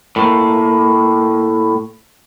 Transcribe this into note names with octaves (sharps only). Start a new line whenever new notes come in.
A2 A#3